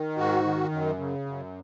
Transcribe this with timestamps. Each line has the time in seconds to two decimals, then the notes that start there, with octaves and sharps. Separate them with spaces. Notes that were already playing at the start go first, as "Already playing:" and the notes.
Already playing: D#3
0.17 G#2 F#4
0.44 D#3
0.72 F#2
0.99 C#3
1.26 F#2